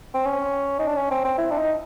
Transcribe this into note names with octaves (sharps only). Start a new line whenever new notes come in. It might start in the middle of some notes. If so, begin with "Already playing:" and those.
C4
C#4
D#4
D4
C#4
C4
C4
E4
D4
D#4